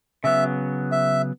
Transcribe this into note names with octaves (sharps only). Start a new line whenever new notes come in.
C#3 F#3 B3 E5
E5